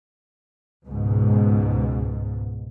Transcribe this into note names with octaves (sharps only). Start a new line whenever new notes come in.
C#2 G#2 B2